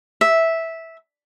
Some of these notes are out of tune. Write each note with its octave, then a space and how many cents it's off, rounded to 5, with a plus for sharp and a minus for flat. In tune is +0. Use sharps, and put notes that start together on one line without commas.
E5 -10